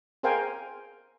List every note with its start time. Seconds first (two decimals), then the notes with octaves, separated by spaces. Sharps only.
0.23 G#4 A#4 C5 F5 G5 G#5